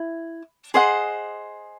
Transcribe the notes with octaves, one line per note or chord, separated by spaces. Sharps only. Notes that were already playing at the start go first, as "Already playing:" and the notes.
Already playing: E4
G#4 C5 D#5 F#5